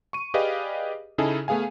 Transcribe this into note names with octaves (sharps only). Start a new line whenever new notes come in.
C#6 D#7
G4 G#4 B4 D5 D#5 F5
C#3 C#4 D#4 E4 G#4 A4
A3 B3 G#4 F5 G#5